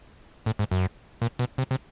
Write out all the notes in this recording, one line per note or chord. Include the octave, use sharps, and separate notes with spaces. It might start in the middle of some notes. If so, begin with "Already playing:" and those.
A2
G#2
F#2
A#2
B2
C3
C3